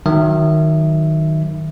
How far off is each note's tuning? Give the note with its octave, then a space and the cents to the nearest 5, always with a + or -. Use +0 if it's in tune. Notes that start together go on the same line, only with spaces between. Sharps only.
D#3 +0 F#3 +0 E5 +0